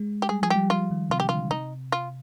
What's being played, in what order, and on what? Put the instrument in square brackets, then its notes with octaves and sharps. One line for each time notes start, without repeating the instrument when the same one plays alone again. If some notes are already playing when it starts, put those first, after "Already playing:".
Already playing: [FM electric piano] G#3
[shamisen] G4
[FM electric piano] G3 [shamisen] G#4
[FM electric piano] F3 [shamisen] G#4
[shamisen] G4
[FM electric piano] G3
[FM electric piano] F3 [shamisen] F4
[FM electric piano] D#3
[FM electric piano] C3 [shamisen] F4
[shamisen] G4
[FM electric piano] D3 [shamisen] F4
[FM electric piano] C3 [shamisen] D#4
[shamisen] F4